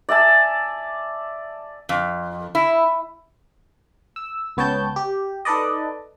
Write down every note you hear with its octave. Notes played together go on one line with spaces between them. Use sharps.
D5 E5 G#5 A5
F2
E4
E6
C#2 B3 C#5 G5 A5 G6
G4
D#4 A4 B4 D5 D#5